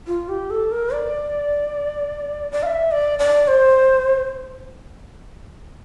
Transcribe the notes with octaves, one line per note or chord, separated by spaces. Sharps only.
F4
G4
A4
A#4
D5
D5
F5
E5
D5
D5
C5